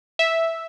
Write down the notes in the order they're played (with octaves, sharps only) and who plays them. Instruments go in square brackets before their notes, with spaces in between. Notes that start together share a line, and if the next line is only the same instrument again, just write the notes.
[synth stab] E5